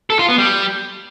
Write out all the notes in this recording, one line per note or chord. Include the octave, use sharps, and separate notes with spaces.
A4
F4
B3
G3